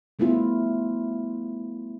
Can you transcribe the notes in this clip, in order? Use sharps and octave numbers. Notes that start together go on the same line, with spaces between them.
G3 A3 B3 E4 F4